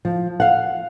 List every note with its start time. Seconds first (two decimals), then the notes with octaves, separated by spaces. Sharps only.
0.05 F3
0.40 F5 F#5